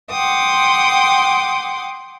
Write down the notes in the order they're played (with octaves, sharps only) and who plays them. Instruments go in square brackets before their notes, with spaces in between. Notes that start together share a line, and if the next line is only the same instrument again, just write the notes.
[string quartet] F#5 G5 C6 D6 D#6